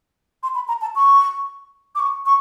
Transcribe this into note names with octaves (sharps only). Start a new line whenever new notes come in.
C6
B5
A#5
A5
C#6
D6
C#6
C#6